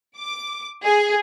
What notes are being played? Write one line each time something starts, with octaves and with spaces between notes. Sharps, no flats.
D6
G#4